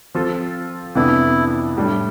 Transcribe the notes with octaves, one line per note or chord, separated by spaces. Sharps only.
F3 C4 F4 A4
F2 C3 E3 B3 D4 E4
A2 G3 D4